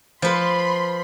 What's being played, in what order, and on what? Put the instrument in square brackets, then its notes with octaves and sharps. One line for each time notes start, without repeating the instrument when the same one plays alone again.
[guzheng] F3 B4 [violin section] B5 C6